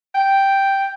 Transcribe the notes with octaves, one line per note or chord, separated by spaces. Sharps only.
G5